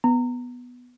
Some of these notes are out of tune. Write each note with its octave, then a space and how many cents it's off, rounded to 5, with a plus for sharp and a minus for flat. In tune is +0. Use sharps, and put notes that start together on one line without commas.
B3 +0 A#5 -25